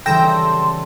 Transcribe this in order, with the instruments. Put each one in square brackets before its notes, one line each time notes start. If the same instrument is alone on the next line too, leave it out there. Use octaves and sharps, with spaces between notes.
[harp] C#3 E3 G3 [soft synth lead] A4 [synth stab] G5 E6 A#6 [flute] C6